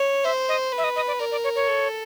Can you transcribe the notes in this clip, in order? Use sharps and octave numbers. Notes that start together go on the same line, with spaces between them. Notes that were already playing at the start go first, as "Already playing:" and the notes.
Already playing: C#5
C5 E5
D#5
B4
E5
D#5
D#5
D5
A#4 D5
D5
C#5
C#5
A4